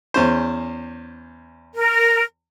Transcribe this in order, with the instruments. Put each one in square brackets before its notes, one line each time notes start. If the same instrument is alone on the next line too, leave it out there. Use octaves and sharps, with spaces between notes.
[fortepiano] E2 C#4 C5
[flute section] A#4